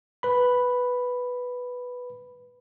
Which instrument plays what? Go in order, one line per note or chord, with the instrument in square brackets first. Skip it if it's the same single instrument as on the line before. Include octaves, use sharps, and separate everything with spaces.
[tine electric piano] B4 B5